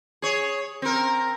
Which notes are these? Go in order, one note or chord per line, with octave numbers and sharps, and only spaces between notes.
G#4 C#5
C4 A#4